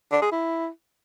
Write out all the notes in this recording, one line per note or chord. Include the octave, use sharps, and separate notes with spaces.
D4
G#4
E4